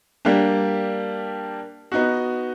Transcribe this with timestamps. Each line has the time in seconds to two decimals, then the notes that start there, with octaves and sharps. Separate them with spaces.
0.25 G3 A#3 D4 G4
1.92 B3 D#4 F#4